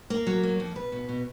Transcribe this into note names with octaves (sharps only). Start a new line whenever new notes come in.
A#3 A#4
F#3
A#3
F2
B2 B4
B2
B2